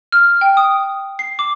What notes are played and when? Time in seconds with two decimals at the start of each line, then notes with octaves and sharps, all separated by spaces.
0.12 F6
0.41 G5
0.57 D#6
1.19 C7
1.39 D6